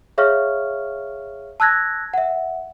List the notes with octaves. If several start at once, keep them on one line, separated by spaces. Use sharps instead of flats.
G#4 C#5 E5 F5 C#6 F6
A5 E6 F#6 G#6 A#6
E5 F#5